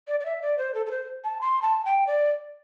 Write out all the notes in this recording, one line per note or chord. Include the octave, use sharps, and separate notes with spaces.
D5
D5
E5
D5
C5
A4
A4
C5
A5
C6
A5
G5
D5